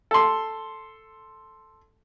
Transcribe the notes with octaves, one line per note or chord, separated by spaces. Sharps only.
A4 C6